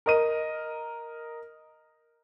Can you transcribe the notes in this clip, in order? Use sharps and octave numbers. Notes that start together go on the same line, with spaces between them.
A#4 D#5 D#7